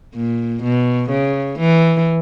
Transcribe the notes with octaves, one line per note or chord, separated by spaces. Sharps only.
A#2
B2
C#3
E3